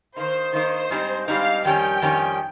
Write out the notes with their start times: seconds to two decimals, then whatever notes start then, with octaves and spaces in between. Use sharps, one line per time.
0.16 D#3 A#3 D#4 C5
0.53 D#3 A#3 D#4
0.90 G#2 G3 C4 D#4
1.28 G#2 G3 C4 D#4 F5
1.65 F2 D#3 G3 C#4 G5
2.02 F2 D#3 G3 C#4